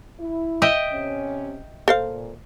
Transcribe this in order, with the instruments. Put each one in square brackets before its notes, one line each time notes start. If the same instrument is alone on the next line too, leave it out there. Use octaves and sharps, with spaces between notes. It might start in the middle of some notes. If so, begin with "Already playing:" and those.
[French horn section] E4
[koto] D#5 E5 G5
[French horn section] C3 C#4
[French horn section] A#2 [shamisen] A4 C5 F5